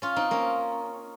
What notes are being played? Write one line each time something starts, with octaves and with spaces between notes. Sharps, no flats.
C#4 F4
C4 D#4
A#3 C#4